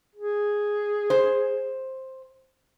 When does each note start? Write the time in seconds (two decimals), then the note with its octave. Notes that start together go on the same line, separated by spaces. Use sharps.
0.15 G#4
1.10 C5